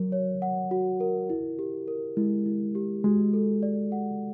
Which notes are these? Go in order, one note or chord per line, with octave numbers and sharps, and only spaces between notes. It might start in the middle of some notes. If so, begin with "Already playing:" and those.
Already playing: F#3 F#4 A#4
C#5
F#5
F#4
A#4
E4
G4
A#4
G#3 E4
E4
G4
G#3 F#4
A4
D5
F#5